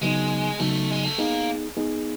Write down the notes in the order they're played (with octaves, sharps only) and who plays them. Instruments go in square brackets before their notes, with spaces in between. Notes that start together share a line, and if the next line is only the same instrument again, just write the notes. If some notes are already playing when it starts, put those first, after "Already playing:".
[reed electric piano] C#3 F#3 B3 D#4 [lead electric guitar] G#3
[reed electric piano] C#3 F#3 B3 D#4 [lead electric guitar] A3
[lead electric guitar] G#3
A3
[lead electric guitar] A#3 [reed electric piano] B3 D#4 G#4
[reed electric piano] B3 D#4 G#4